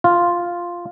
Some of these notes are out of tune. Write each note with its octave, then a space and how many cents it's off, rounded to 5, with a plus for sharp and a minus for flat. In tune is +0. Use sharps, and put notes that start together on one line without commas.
F4 +0